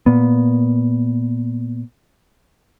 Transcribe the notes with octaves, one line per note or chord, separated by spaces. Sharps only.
A#2 B3